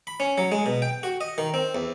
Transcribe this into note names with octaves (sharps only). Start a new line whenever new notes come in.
B5
C#4
F#3
G#3
B2
G5
F#4
D#5
D#3
C4
E2